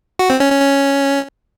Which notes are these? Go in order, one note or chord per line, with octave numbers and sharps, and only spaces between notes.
F#4
C4
C#4
C#4
C#4